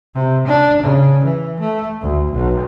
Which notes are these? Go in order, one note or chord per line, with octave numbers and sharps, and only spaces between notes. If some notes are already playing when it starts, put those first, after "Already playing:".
C3
D4
C#3
E3
A3
D2
B1